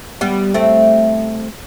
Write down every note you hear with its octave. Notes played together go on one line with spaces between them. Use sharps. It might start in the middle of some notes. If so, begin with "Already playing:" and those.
G3 B3
A3 C4